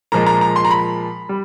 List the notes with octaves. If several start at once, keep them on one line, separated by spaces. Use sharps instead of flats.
A#2 F3 G#3 A#5
A#5
A#5
C6
A#5
B5
G3